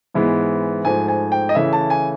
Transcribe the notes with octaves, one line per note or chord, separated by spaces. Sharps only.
G#2 E3 G#3 B3
G#2 F3 A3 G#5
G#5
G5
D#5
C#3 E3 A3 E5
A5
G#5